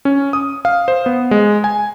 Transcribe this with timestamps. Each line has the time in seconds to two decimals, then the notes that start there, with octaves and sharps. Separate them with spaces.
0.05 C#4
0.33 D#6
0.65 F5
0.88 C5
1.06 B3
1.31 G#3
1.64 G#5